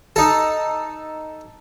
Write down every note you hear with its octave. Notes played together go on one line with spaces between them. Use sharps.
D#4 A4